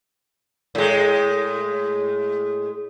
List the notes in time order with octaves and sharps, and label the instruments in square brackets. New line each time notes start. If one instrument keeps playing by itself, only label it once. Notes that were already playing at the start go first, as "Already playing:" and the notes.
[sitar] A2 G#3